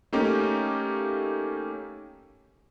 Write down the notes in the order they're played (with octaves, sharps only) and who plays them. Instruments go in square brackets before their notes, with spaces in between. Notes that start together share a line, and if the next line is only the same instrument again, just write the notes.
[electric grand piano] A3 A#3 C#4 D#4 G4